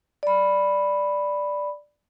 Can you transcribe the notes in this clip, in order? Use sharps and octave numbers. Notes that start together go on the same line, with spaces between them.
D5 B5